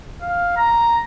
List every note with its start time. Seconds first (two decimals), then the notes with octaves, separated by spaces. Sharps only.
0.22 F5
0.57 A#5